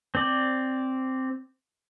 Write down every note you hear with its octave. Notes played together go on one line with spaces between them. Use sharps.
C4 D5